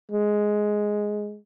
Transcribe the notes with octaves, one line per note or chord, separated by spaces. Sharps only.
G#3